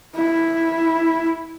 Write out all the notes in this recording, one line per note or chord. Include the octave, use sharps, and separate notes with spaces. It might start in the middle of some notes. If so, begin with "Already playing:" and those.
E4